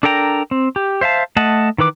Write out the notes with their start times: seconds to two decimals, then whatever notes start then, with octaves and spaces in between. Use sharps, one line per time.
0.03 D4 A4 A#4 G5 A#5
0.51 C4
0.76 G4
1.01 C5 E5 F5 A5
1.37 A3 D#5 F#5 A5
1.78 D#3 E3 B4 D6